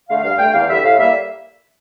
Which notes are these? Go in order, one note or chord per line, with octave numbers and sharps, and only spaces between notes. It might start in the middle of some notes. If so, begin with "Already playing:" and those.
D3 A3 F5
G2 F5
D3 A3 G5
E2 F5
D3 G3 E5
A2 F5
G3 A#3 E5